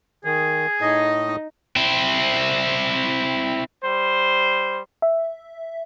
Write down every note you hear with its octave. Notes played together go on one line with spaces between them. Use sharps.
D#3 G#4
A2 D#4 D#5
C4 E4
G3 C5
E5